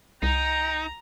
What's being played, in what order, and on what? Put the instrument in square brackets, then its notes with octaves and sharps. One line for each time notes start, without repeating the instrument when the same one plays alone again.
[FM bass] C2 [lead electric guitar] D#4 [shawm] G5 [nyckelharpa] A#5